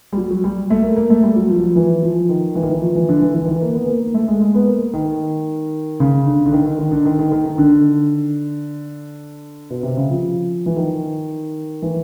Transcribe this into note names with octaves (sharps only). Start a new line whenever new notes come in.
G3
F#3
F#3
G3
A3
A#3
A#3
A3
G3
F#3
F3
F#3
F3
E3
F3
D#3
E3
D#3
E3
F3
E3
D3
E3
E3
D#3
E3
A#3
B3
A#3
A#3
A3
G#3
G#3
B3
A#3
D#3
C#3
D3
D3
D#3
D#3
D#3
D3
D#3
D#3
D#3
D#3
D3
B2
C3
C#3
F3
E3
D#3
E3